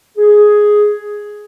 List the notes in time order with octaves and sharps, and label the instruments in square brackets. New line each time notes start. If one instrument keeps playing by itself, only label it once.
[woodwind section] G#4